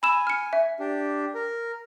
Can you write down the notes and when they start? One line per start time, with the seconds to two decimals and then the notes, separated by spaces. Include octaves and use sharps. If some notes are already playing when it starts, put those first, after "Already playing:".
0.03 G#5 B5 E6 E7
0.27 F6 C#7
0.53 E5
0.79 D4 G4
1.35 A#4